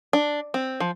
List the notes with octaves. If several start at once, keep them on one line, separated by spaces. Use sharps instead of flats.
D4
C4
F3